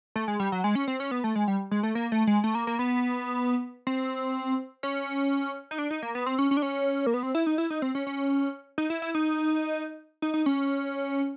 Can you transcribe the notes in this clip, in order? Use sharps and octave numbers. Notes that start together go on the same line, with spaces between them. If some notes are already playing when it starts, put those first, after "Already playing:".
A3
G#3
G3
F#3
G#3
C#4
C4
C#4
B3
A3
G#3
G3
G#3
A3
A#3
A3
G#3
A3
A#3
A#3
B3
C4
C#4
D#4
D4
D#4
A#3
B3
C4
C#4
C#4
D4
C#4
A#3
B3
C4
E4
D#4
E4
D#4
C4
C#4
C#4
D#4
E4
E4
D#4
D#4
D#4
C#4